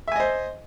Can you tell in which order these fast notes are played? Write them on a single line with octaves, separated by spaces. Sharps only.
E5 G#5 D#5 C5